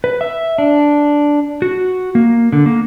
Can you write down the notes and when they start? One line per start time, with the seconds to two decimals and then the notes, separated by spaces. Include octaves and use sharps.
0.04 B4
0.21 E5
0.58 D4
1.62 F#4
2.15 A#3
2.53 D3
2.66 A#3